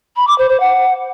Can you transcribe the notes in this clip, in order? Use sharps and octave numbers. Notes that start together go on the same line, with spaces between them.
B5
D6
C5
C5
F#5